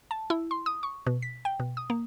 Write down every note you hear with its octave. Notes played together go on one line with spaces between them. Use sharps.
A5
E4
C6
D#6
C#6
B2
B6
G5
B2
D#6
A#3